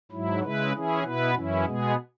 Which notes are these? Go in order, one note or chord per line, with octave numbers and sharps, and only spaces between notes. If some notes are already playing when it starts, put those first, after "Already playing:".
G#2 F#3 E4
C#3 G#3 E4 B4
E3 C#4 E4 G#4
B2 B3 E4 B4
F#2 E3 C#4 E4
B2 G#3 B3 G#4